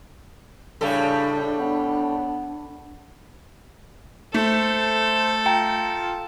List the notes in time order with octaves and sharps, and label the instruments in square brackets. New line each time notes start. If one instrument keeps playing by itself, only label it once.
[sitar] A2 G3 A4 [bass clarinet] C#3 [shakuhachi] D4
[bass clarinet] B3
[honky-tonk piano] A3 [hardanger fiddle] A4 [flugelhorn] C5
[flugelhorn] F4 [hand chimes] G5 A#5